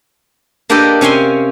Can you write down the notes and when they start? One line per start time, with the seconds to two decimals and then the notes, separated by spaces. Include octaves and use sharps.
0.70 A#3 D4 G4 A4 B4 D#5
1.01 C3 C#4 F5 G#5 C6